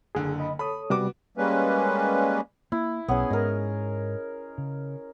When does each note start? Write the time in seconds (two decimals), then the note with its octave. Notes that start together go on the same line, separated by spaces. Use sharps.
0.15 F#1 D3 G#4
0.40 D#5 B5
0.59 A4 C#5 B5 D#6
0.90 C3 G3 B3 F#4 D6
1.37 G3 G#3 A#3 C#4 B4
2.72 A#3 E4
3.08 B1 B3 C#4 G#4
3.30 G#2 A#4 D#5
4.58 C#3